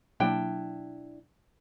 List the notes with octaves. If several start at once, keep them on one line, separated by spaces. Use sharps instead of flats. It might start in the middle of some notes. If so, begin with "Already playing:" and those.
B2 F#3 A#3 D4 E4 G5